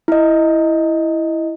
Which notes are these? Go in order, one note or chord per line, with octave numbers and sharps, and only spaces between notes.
E4 D#5